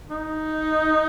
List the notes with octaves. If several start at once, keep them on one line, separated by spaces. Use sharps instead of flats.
D#4